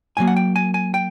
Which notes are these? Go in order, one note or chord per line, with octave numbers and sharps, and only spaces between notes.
A2 F#3 A#3 G#5
F#5
G5
G#5
G#5
G5